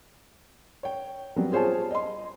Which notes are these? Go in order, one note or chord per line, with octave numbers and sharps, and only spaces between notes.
C#5 G5
F#3 G3 B3 C4
F4 G#4 C5 C#5 G#5 A5
D#5 C6